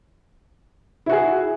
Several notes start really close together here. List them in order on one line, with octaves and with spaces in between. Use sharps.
E4 F#4 G#4